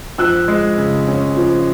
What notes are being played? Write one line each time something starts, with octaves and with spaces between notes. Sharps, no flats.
F3 E6 F#6
G#3
C#3
C#4
F3